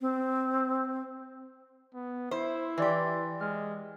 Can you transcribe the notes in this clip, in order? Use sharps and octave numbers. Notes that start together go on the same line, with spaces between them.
C4
B3
E4 C5
E3 G4 B4 D5 C6
G#3 F6